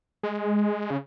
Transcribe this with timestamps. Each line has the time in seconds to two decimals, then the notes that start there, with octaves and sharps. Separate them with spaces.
0.23 G#3
0.90 C#3